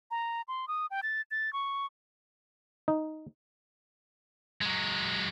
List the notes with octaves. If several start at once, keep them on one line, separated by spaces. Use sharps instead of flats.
A#5
C6
D#6
G5
A6
A6
C#6
D#4
F#3 G#3